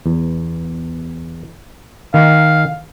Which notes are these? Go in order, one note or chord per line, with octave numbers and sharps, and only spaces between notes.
E2
D#3 F5